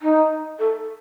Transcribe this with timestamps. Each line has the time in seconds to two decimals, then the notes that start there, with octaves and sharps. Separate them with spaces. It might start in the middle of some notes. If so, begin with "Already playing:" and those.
0.01 D#4
0.58 A4